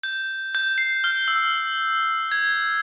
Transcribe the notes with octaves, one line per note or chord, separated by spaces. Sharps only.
G6
G6
C7
F6
E6
G#6